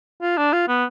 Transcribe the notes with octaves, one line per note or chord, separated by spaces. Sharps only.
F4
D4
F4
B3